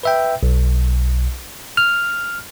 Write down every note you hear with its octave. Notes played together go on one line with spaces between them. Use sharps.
B4 E5 G5
B1
F6